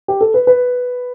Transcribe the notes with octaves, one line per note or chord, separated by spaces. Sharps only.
G4
A4
B4
B4